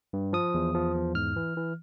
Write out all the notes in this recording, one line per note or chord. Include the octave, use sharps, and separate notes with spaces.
G2
F3 D#6
E2
F3
E2
G#2 F6
E3
E3